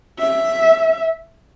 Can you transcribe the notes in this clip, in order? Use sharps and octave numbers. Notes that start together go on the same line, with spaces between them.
E5